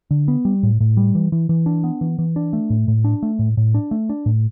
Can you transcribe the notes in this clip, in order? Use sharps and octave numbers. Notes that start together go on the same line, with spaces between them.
D3
B3
G3
A2
A2
G3
E3
E3
E3
D4
B3
E3
E3
D4
A3
A2
A2
D4
A3
A2
A2
D4
A3
D4
A2